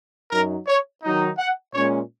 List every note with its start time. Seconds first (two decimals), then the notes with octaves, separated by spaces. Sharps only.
0.32 F#2 F#3 D#4 A#4
0.68 C#5
1.04 D#3 F#3 D#4
1.39 F#5
1.74 A#2 G#3 C#4 C#5